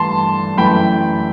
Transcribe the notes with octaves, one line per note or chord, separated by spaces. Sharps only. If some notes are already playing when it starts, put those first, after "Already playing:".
Already playing: G2 E3 A3 A5 C6
F#2 E3 A3 E4 G5 B5